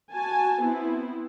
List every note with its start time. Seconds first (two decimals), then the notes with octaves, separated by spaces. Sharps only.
0.14 F#4 G#5 A5
0.63 B3 C4 E4